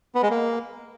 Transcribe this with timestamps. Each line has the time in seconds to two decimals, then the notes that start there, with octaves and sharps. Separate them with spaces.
0.15 B3
0.23 G#3
0.31 A#3